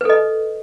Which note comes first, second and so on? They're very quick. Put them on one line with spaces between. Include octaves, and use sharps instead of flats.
B4 A4 D#5